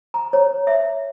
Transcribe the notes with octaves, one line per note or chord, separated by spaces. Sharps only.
A#5
C#5
E5